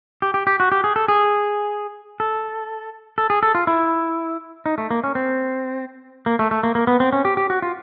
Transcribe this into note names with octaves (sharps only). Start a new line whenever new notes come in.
G4
G4
G4
F#4
G4
G#4
A4
G#4
A4
A4
G#4
A4
F4
E4
D#4
A3
A#3
C#4
C4
A#3
A3
A3
A#3
A#3
B3
C4
C#4
G4
G4
F#4
F4